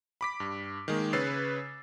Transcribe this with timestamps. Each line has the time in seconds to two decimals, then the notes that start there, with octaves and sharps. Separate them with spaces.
0.21 B5 D6 B6
0.40 G2
0.88 D#3 G#3 A#3
1.13 C#3 B4 C#5 E6 A6 C7